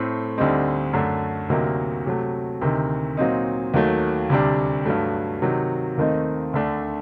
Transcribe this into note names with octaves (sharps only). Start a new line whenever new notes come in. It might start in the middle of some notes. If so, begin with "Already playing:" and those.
Already playing: A2 A3 C4
D2 D3 G3 C4 D#4
F#2 D3 A3
D2 C3 F#3 A#3 D#4
C3 F#3 A3
D2 C3 D#3
A#2 F#3 C4 D#4
D#2 D#3 F#3 A3
D2 C3 G3 D4
G2 F#3 A3
C3 D#3 F#3
D#2 D#3 A3 C4 D#4
D2 D3 A3 D4